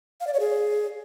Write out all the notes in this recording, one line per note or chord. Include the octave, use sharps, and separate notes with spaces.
F5
D5
C#5
G#4